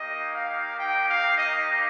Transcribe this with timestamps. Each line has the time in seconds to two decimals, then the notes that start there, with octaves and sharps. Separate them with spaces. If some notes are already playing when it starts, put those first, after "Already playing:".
Already playing: A#3 D#4 G4 D#5
0.33 F5
0.78 G5
1.07 F5
1.37 D#5